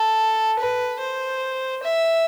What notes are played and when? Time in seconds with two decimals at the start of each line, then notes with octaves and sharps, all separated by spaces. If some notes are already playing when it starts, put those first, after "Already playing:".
Already playing: A4
0.59 B4
1.00 C5
1.83 E5